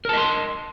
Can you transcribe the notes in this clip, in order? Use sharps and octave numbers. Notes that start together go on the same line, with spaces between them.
A#4 D#5 A5 C6